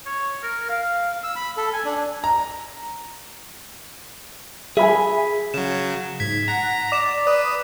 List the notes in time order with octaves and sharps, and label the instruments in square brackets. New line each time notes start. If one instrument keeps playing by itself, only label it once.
[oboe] C#5
A#4
F5
[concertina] E6
B5
A4
G#5
D4
[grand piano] A#5
[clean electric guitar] G#4 B5 [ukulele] E5 G#5
[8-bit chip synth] C#3 F#3 [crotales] E7
[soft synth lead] G#2 [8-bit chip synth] G#6 [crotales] B6
[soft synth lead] F#5 [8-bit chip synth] A#5
[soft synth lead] D5 [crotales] D6 E7
[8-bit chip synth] B4 [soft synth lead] D#6